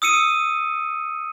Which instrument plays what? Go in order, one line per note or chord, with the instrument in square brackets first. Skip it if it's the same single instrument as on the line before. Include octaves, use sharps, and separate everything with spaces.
[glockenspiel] D#6 E6 C#7 D#7